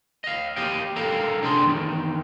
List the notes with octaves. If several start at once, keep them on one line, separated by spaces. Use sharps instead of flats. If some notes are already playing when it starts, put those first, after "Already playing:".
D#5 F5
A#3 G4 D#5 F5 G5
A4 A#4 F5 G5 A#5
C2 G3 D4 G#4 A4 C6
E2 D#3